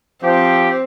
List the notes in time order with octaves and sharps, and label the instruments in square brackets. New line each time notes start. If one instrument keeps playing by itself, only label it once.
[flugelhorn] F3 [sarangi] C4 [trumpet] G4